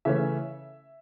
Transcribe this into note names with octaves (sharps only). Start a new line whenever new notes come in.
C#3 E3 A3 C#4 E5